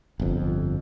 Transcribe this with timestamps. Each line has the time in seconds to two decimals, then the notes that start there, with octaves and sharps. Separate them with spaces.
0.20 G1 F2